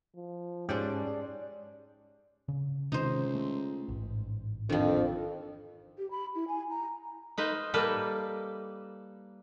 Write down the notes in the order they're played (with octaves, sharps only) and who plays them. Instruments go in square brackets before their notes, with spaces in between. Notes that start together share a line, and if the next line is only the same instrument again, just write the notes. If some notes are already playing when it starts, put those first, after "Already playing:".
[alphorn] F3
[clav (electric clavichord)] G#2 G4 [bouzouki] G#3 D4 D5 [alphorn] C#4
[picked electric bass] C#3
[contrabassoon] C#2 [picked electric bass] C3 D#3 [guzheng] D#4 C5
[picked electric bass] A3
A1 G#2
[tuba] F2 [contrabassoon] D3 [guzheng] D#3 F3
[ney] G4
B5
E4
G#5
A#5
[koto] D#4 B4 C5 F5
G3 A#3 A4 B4